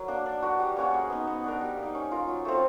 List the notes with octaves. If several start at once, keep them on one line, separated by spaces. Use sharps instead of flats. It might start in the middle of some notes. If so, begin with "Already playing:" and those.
Already playing: F#3 A#4
A#3 D4
D4
F#4 B4 D5
G3
A#3 C#4 F#4
G#3
B3 D#4
B3
D4 F#4 A#4
G3
A#3
D#4
C#4
F4 A#4
F#3
A3 C4 F4